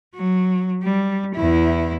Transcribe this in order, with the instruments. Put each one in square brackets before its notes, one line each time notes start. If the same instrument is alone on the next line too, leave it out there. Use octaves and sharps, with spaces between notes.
[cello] F#3
G3
E2 E4